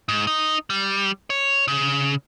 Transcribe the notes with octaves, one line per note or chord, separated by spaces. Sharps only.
G#2
D#4
G3
C#5
C#3